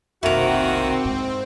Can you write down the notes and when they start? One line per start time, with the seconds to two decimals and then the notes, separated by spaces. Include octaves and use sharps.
0.23 F1 B1 D#3 A#3 C4 E4 F#4 A#4
1.05 G#2